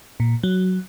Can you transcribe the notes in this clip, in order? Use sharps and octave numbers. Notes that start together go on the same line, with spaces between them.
A#2
F#3